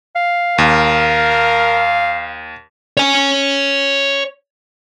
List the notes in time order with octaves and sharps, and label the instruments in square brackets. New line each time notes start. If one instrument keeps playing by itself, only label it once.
[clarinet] F5
[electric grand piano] D#2 [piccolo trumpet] A#4
[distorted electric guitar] C#5 G#5